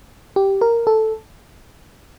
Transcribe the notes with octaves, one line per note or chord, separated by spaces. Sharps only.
G4
A#4
A4